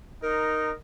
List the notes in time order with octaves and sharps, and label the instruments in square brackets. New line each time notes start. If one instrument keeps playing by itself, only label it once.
[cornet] D#4 [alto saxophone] A#4